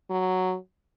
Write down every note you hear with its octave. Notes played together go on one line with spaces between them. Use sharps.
F#3